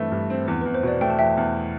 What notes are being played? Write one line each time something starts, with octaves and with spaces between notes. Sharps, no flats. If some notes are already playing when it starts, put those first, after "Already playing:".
Already playing: G2 E3 A3 C4
G2
C4
E2 C5
B4
E2
C5
B2 D5
A3 G5
A5
E2 E5 G5
E2